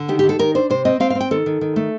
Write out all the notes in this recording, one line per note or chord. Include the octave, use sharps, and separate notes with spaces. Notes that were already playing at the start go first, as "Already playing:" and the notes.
Already playing: D3
D#3 G4
G4
D#3
A4
D#3 A#4
D4 C5
C3 C5
C4 D#5
C4 F5
F5
C4
G5
D#3 A4
D#3
D#3
A3